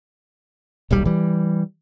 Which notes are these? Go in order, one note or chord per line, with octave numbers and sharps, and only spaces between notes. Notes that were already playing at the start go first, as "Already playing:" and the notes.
D#1 B1 G3
E3 G3